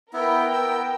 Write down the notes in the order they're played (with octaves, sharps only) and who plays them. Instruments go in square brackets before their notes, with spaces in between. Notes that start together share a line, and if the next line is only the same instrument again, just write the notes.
[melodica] B3 E4 [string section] A#4 G5
[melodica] B3 E6